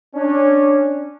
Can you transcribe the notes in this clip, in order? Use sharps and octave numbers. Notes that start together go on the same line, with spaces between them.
C#4 D4